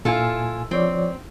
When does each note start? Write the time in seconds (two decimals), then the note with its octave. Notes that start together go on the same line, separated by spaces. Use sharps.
0.05 A#2 E4 F4 A4 G#5
0.71 F3 C4 C#5 D5